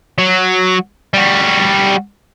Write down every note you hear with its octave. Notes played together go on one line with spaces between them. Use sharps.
F#3
G3 F#4